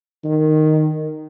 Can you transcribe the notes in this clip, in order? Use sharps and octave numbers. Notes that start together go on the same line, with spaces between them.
D#3